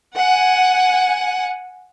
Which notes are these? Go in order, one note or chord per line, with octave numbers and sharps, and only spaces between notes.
F#5 G#5